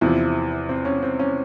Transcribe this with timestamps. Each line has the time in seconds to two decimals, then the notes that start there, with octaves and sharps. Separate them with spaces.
0.01 E2 C3 F3 E4
0.69 C4
0.85 C#4
1.03 C4
1.19 C#4